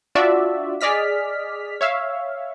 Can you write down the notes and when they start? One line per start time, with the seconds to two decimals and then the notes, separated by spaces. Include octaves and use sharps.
0.15 D4 F4 F#4 D5 E5
0.81 G#4 D5 D#5 F6 B6
1.81 C#5 E5 F5